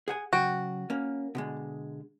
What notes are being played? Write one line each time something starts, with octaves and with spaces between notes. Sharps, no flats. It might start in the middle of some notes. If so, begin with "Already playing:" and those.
G#4 F#5 G#5
C#3 F#3 F#4 G5
A#3 C#4
B2 D3 G#3